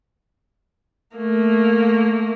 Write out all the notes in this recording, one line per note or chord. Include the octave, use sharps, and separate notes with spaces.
A3 A#3